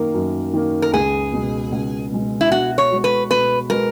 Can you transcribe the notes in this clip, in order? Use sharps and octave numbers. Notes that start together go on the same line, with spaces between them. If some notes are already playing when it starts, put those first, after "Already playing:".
Already playing: F#2 D#3 A#3 A#4
F#2
D#3 A#3
A#4
C#2 G#4
B2 G#3
C#2
B2 G#3
E4
B2 F#4
C#5
G#3 B3 F#4
B4
B2 B4
G#3 B3 F#4 A#4